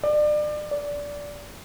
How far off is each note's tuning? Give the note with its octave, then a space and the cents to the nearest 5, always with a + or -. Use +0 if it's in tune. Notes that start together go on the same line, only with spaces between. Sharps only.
D5 +30
D5 -20